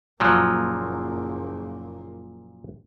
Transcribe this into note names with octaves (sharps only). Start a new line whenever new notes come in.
F#1 A#2 F3 F#3 A#3